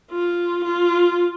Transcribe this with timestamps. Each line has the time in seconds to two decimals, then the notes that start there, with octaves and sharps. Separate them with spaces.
0.11 F4
0.64 F4